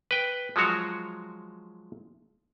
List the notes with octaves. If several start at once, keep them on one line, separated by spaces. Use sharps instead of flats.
B4 G5
F3 F#3 G#3 F#4 C#5